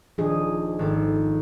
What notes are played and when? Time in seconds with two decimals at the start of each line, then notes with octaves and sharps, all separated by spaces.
0.18 D#1 F3 D4 G#4
0.79 G#1 A4